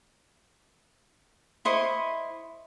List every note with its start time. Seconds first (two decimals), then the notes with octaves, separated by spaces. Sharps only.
1.65 E4 C5 D#5 C#6